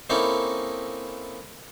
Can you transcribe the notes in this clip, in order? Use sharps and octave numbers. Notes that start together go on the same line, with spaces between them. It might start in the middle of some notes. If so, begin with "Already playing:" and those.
A#3 C4 C#4 D#4 E4 A4